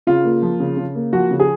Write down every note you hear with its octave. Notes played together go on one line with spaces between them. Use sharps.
C#3 F4
A#3
F3
C#3
C#3
A#3
F3 F#4
C#3
G#4